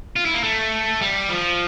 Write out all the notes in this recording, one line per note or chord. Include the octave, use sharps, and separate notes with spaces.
F4
E4
A#3
A3
G3
F3